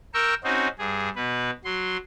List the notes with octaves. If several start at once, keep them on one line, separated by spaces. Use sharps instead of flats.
A#4 G5 C#6 E6
C4 C#4 D#4 F#4
G2 G#4
B2 B4
F#3 C6